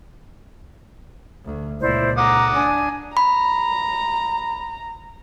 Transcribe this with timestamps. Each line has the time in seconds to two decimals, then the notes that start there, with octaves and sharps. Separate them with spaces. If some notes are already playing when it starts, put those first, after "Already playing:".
1.45 D2
1.81 C#2 A#2 E4 C5 D5
2.17 F#5 A#5 D6 D#6
2.53 D4 G#5
3.17 A#5 B5